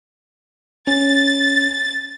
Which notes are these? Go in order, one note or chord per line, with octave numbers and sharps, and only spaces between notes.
C#4 A6